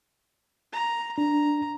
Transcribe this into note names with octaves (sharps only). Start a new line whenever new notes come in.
A#5
D4 A#5